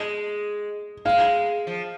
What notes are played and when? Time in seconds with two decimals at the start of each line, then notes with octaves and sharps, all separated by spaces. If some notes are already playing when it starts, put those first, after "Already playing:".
Already playing: G#3 D#5
1.05 G#3 F5
1.67 F3